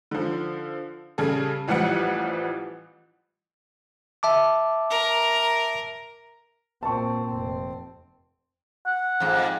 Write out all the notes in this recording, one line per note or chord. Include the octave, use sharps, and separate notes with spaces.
D3 F3
C#3 G3 G#4 A4
A1 E3 F3 G3 F#5 C#7
E5 A5 D6
A#4
A#2 C4 A5 C#6
F1 C4
F#5
F2 G#2